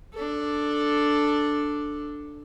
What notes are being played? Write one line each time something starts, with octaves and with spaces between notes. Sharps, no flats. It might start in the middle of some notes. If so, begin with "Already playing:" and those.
D4 A4